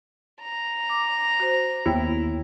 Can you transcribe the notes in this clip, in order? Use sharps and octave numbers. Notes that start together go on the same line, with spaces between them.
A#5
D6
F#4 C5
D#2 B3 E4 C#5 G5